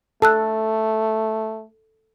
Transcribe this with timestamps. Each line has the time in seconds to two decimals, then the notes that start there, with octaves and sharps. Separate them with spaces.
0.22 A3 A4 A5 E6 F#6